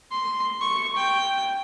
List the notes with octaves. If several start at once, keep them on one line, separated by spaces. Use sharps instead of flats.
C6
C#6
G5